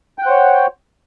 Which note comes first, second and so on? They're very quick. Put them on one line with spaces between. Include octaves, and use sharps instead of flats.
G5 F#5 C5 C#5